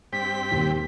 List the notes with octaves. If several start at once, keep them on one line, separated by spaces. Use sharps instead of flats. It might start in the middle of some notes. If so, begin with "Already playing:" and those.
G2 C4 G5 B6
D#2